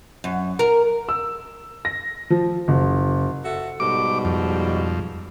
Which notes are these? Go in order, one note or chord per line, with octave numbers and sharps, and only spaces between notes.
F#2
A#4
E6
A#6
F3
F#1
F#4 A4 E5
G#2 B2 G3 D6
F2